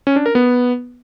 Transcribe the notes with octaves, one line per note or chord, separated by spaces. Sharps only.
C#4
D4
A#4
B3